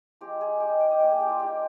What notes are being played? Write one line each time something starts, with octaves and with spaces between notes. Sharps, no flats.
F3 G#3 C4 G4
G#4
G#3 C4 D#4 G4
D#5
G5
D#5
G3 A#3 D4 D5
G#4
G4
F4
G#3 C4 D#4 G4